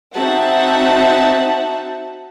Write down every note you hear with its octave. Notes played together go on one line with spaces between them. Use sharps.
C4 D#4 F#4 E5 F#5 A5